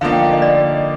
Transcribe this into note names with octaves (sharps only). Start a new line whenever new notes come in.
D3 F3 A#3 D#4 F5
G5
F5
D#5
D5